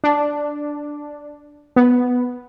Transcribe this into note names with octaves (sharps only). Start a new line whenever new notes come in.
D4
B3